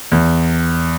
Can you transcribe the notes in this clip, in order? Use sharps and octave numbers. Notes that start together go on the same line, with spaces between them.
E2